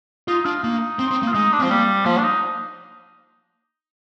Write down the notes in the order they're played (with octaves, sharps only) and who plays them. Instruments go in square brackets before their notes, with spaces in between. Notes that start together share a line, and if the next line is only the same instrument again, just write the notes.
[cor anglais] D#4 [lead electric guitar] F4
[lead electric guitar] D4 [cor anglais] F4
[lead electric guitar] A#3 [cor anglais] D#4
[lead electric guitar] C4
C4
A#3
[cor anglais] F4
[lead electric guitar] G#3 [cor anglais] D#4
[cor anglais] D4
[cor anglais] F3 [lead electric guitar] C4
[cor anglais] G3 [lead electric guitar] A#3
[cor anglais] F3 [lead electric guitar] A#3
[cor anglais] D4
D#4